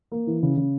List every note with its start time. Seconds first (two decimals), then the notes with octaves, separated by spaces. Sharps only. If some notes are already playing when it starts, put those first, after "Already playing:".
0.12 A#3
0.27 E3
0.43 C#3
0.57 C#3